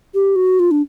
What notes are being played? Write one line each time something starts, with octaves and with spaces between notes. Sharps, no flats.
G4
F#4
F4
D4